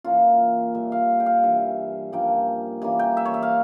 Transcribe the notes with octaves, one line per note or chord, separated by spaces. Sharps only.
E3 A#3 C#4 F4
A#2 G3 C#4 E5
F5
G5
F5
G2 E3 G3 E5
G2 F3 A#3 C#4 G5
E3 G3 A#3 C#4 G#5
G5
E5
C#5
E5
F5